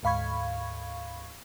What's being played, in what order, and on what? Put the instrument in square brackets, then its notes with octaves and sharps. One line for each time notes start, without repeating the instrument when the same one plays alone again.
[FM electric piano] D2 G#2 F5 B5 C#6 G#6